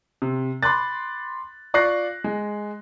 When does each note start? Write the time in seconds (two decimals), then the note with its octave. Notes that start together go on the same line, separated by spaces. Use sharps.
0.22 C3
0.63 B5 C6 D6 F#6 A6
1.74 F4 D5 C#6 F#6 A#6 C7
2.24 G#3